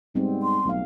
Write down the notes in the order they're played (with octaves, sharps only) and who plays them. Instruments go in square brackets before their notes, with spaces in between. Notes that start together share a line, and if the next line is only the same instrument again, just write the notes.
[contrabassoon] G#2 [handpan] G3 B3 C4
[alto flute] C6
[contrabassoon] B1 [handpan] A3 F5